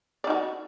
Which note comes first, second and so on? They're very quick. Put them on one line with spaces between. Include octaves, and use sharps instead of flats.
D5 D#4 F#4